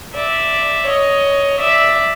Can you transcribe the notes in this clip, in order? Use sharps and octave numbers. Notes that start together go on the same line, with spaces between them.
D5 E5
C#5 D#5
D5 E5